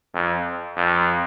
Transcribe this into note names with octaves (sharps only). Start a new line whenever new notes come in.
F2
F2